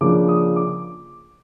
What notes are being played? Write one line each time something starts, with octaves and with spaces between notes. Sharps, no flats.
C#3 F3 A#3 D4 D6
D#6
D6